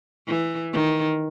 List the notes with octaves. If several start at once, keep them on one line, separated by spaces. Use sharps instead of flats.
E3
D#3